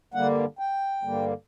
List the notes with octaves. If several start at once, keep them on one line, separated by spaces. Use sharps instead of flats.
G2 D3 G3 A#3 F#5
G5
G2 D3 G3 A#3